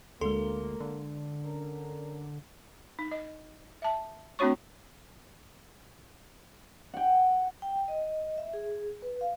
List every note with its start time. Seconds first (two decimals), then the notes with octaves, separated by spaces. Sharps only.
0.21 D2 G#3 A#3 A4 C6
0.80 D3
1.45 C#4 A#4
2.99 D#4
3.11 D#5
3.82 E5 A5
4.39 A3 C4 D4 F#4 C#5 C#6
6.94 F#5 G5
7.62 G5
7.88 D#5
8.38 E5
8.53 G#4
9.02 B4
9.21 F5